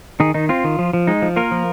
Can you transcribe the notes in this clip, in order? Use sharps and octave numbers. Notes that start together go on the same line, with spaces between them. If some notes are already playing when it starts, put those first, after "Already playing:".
D#3 D#4 G#4
D#3 D#4
C4 F4
D#3
F3
F3
G#3 D#4
F3
A#3 F4 A#4
F3